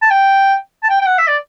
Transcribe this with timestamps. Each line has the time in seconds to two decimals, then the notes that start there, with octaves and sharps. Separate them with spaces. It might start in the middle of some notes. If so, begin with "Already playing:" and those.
0.02 A5
0.11 G5
0.83 A5
0.90 G5
1.01 G5
1.07 F#5
1.18 E5
1.28 D5